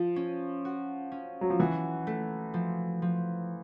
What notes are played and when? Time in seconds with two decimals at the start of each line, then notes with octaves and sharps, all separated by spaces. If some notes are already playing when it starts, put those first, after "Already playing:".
Already playing: F3
0.16 C#4
0.65 F#4
1.12 C#4
1.41 F#3
1.50 F3
1.60 E3 F#4
2.07 A3
2.54 F3
3.02 F3